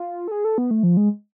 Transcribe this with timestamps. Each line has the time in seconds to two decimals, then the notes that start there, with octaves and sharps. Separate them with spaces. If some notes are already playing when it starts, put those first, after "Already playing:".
Already playing: F4
0.28 A4
0.31 G#4
0.45 A4
0.58 B3
0.71 A3
0.83 F3
0.97 G#3